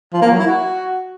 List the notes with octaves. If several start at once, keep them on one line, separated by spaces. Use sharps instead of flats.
F3
A#3
F#3
E4
F#4